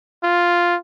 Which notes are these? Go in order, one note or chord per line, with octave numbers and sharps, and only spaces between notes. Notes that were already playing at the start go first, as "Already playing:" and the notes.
F4